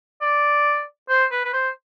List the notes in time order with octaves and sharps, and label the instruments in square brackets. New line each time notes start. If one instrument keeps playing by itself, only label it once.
[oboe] D5
C5
B4
B4
C5